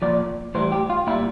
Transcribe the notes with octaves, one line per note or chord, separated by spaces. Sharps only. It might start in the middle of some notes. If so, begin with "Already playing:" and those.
A#2 F3 D5
A2 E3 G3 C5
G4
F4
A#2 G3 E4